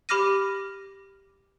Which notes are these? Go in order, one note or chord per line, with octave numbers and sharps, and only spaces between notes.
G4 B5 D6 F6 A#6 D#7